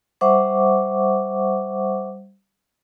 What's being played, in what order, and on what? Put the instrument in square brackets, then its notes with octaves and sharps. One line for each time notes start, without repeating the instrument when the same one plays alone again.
[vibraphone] G3 C5 E5 F#5 C#6 D6